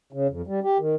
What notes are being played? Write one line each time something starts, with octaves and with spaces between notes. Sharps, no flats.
C#3
F2
G3
G4
D#3